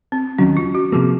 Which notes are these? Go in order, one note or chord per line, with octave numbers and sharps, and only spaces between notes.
C4
D#2 D#3 F#3 C#4
F4
F#4
C3 F3 A#3 G#4